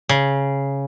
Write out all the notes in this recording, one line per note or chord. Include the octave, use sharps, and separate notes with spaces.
C#3